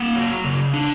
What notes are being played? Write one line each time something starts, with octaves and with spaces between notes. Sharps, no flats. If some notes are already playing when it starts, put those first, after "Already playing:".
Already playing: A#3 F#5
F#3
C#3
D4